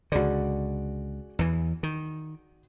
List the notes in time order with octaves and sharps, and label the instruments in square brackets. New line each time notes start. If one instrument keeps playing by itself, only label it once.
[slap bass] C#2 D3 [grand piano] F#4 G#4 D5
[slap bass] E2 E3
D#3